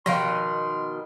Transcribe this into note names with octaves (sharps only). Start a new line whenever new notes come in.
B2 D#3 F3 F5 C6